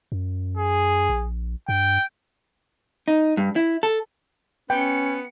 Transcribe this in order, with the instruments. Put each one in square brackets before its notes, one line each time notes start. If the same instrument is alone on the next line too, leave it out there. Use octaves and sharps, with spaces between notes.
[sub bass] F#2
[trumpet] G#4
[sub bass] A#1
[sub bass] G2 [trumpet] G5
[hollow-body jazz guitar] D#4
G2
E4
A4
[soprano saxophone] B3 [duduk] C#4 [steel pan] G5 [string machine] C#7